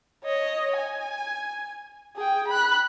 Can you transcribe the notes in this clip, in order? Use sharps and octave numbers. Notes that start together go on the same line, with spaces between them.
C#5 D#5
G#5
G#4 G5
B5 F#6